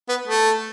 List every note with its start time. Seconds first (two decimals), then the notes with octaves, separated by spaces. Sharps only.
0.09 B3
0.28 A3